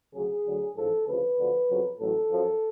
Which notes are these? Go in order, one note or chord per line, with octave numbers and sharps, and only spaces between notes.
D2 C#3 F#3 G#4
D2 D3 F#3
A1 G#2 F3 A4
D2 C#3 F3 B4
D2 D3 F3
F2 C#3 F#3
A1 A2 F#3 A4
F#2 F3